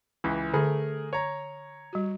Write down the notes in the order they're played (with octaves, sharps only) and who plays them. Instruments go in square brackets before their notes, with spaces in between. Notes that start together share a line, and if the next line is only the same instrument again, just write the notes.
[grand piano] C#2 E3
[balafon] D3 [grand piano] A3 G#4 A#4
[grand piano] C#5 A#5
[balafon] G3 F#4